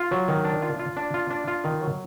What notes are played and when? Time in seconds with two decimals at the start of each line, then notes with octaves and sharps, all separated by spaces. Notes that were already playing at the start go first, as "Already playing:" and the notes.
Already playing: F4
0.11 F#3
0.28 D#3
0.45 D4
0.62 F4
0.79 F4
0.97 D4
1.14 F4
1.30 D4
1.48 F4
1.64 D#3
1.82 F#3